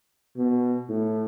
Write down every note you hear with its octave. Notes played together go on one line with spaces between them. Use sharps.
B2
A2